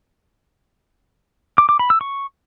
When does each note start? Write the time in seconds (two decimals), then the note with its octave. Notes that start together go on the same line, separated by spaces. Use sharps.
1.58 D6
1.69 D6
1.79 B5
1.90 E6
2.01 C#6